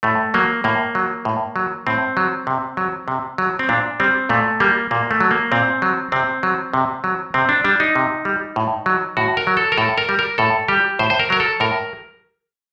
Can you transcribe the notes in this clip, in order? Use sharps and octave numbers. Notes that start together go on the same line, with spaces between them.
A2 A3
F#3 A#3
A2 A#3
F#3
A2
F#3
A2 C4
F#3
C3
F#3
C3
F#3
C4
A#2 D4
G3 C4
A#2 A3
G3 A#3
A#2 A#3
A3
F#3
A#3
A#2 C4
F#3
C3 C4
F#3
C3
F#3
C3 C4
D4
G3 D4
D#4
C3
G3
A2
F#3
A2 F#4
A#4
F#3
A4
A#4
A2 A4
A#4
G3
A#4
A2 A4
G3 G4
A2 C5
C5
A#4
F#3 A#4
A4
A2 A#4